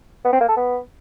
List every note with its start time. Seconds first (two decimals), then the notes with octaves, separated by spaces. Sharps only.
0.25 B3
0.33 C4
0.41 A#3
0.49 A4
0.57 B3